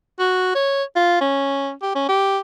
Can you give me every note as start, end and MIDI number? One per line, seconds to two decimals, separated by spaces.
0.19 0.50 66
0.55 0.83 73
0.96 1.18 65
1.21 1.71 61
1.82 1.95 67
1.95 2.04 61
2.09 2.39 67